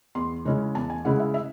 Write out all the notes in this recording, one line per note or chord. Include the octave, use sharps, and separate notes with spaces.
E2 C6
C#3 G#3 C#4 E4
E2 A5
G#5
C#3 G#3 C#4 E4 F#5
E5
E5